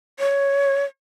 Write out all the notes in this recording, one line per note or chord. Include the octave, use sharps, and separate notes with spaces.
C#5